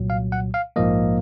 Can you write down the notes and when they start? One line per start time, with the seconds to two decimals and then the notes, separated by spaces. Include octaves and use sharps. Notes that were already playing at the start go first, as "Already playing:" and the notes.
Already playing: C2 A#2 F#3
0.10 F5
0.32 F#5
0.54 F5
0.76 A#1 G#2 F3 A#3 D#5